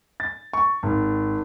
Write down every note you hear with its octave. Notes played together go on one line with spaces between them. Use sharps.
A6
C#6
G#1